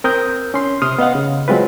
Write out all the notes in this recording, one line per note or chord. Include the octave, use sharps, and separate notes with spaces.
C4 A#4 D#6 G6
C#4 C6
C3 C6 D#6 F6
B3 D#5 F5 F#5
C#3
F#3 G#3 C4 F4 B4